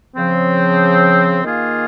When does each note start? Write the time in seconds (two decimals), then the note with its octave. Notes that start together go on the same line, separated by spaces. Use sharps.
0.16 C#3 F3 C4
1.43 D#3 A#3 F4 G#4